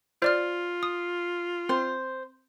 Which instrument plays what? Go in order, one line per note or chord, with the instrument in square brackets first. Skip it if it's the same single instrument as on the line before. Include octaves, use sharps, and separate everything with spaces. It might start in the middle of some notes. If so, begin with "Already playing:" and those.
[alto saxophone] F4 [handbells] C5 D5 F6
[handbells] D#6
[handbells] C4 [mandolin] C5